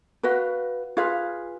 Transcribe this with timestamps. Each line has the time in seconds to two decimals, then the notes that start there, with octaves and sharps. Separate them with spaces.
0.23 F#4 B4 F5
0.97 F4 G#4 B4 F5